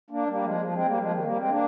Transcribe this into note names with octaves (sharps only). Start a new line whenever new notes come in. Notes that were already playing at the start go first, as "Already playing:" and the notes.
A#3 D4
G3 A#3
F3 G#3
F3
G#3 C4
G3 A#3
F3 G#3
D#3 G3
G3 A#3
G#3 C4
A#3 D4